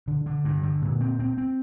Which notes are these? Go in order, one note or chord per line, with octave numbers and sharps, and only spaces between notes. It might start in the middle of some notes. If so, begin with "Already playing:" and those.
D3
D3
G2
D3
A#2
C4
C4
C4